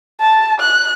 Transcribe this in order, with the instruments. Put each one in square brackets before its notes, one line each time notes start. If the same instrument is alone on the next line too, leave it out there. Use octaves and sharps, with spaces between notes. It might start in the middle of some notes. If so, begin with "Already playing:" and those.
[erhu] A5
F#6